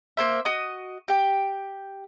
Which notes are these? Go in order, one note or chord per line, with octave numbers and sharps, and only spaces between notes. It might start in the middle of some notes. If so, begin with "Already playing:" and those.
A#3 C5 E5
F#4 D#5 D#6
G4 G5